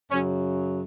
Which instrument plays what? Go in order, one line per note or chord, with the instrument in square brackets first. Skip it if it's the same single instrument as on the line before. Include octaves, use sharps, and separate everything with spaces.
[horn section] F#2 C#3 F#3 C#4